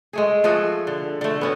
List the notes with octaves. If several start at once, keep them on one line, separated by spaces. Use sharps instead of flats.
G#3 A3 G#4
F3 A3 F#4 G#4
D3
D3 A3
B3 C#4 F#4